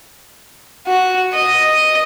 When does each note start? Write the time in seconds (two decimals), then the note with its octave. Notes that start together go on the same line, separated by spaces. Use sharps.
0.87 F#4
1.34 D#5